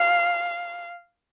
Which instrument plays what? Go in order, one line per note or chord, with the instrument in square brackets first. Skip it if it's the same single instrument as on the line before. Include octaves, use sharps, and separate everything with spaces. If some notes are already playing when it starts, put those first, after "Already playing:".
Already playing: [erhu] F5